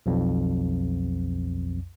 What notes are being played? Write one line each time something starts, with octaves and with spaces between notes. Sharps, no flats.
B1 F2